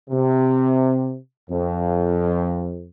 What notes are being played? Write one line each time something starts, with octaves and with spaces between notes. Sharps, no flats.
C3
F2